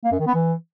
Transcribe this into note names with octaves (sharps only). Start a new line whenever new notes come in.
A#3
F#2
D#3
B3
E3